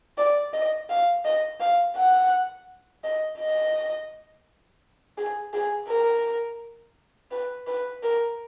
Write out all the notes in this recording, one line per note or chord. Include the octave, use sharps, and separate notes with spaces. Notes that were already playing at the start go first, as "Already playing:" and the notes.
D5
D#5
F5
D#5
F5
F#5
D#5
D#5
G#4
G#4
A#4
B4
B4
A#4